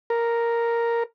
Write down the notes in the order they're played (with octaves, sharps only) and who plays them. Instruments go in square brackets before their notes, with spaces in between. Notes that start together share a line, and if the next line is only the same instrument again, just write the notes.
[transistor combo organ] A#4